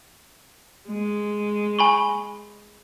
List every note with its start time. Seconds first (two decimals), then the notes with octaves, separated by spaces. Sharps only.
0.88 G#3
1.79 G#5 B5 C#6